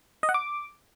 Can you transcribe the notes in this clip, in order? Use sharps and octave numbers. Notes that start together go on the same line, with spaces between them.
D#5
F#5
D6